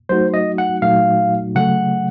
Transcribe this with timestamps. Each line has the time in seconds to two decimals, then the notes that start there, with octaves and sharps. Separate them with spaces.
0.09 F#3 A3 D#4 F#4 C5
0.34 D#5
0.58 F#5
0.82 A#2 F#3 A3 D#4 F#4 F5
1.55 C#3 F#3 A3 F#5